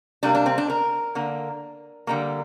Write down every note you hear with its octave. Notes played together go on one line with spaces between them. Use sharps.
C3 G3 A#3 D4
D4
C4
D4
A#4
D3 A#3
D3 G3 A#3